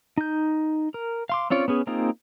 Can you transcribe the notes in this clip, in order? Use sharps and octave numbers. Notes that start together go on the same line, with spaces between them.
D#4 G6
A#4
F5 C6 D6
C4 C#4 F4 C#5 D5
B3 C#4 G#4
A#3 C4 D#4 F4 G#4